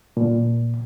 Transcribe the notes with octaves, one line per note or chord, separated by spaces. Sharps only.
A#2